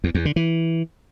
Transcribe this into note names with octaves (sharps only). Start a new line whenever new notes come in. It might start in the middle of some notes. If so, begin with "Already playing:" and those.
E2
E2
D3
E3